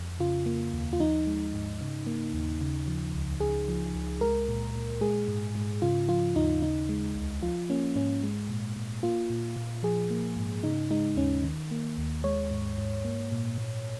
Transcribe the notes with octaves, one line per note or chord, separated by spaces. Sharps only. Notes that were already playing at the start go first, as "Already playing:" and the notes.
Already playing: F2
C#3 F4
A#3
D#2
F4
F3 D#4
G#3
G#2
C#3
A#3
D#2
C#3
F3
C#2
C#3 G#4
F3
C#2
G#3 A#4
A#2
A#2
G#3 G#4
G#2
G#2
C#3 F4
F3 F4
D#2 D#4
C#3 D#4
G#3
C#2
F3 F4
A#3 C#4
G#2 C#4
G#3
A#2
A#2
A#3 F4
A#2
A#2
F3 G#4
A#3
G#2
C#3 D#4
G#3 D#4
D#2 C#4
D#3
A#3
D#2
G#3 C#5
G#2
G#2
A#3
A#2
A#2